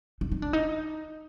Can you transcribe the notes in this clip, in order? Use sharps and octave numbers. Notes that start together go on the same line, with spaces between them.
D#4
D#4
D4
D#4